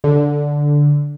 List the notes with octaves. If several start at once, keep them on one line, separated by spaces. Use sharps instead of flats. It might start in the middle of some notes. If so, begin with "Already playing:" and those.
D3